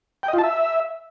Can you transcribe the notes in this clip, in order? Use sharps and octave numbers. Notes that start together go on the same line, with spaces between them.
G5
D#5
F4
A5
E5